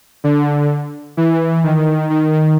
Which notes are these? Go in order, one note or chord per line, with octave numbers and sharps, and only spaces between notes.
D3
E3
D#3
D#3